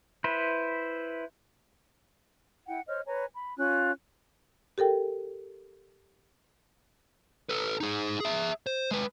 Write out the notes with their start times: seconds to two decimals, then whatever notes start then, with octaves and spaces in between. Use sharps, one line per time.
0.24 E4 B4 C5
2.67 E4 F#5 G5
2.89 C5 C#5 D#5 F6
3.07 B4 C#5 G#5 A#5
3.34 B5
3.58 C#4 F4 F#6
4.78 G4 A4 A#4 G5
7.49 A4 B4
7.81 D#4 G#4
8.20 G#4 E5
8.67 C5
8.91 G#3 B4